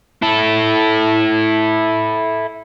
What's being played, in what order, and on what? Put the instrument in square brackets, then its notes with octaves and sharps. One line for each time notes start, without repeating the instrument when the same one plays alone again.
[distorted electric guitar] E4 A4